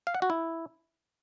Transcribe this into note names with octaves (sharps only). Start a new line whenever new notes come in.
F5
F#5
F#4
E4